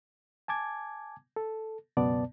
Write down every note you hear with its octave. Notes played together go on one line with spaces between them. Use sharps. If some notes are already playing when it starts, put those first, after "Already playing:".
G#5 A5 D6 G#6
A4
C#2 F#2 B2 B3 D5 A5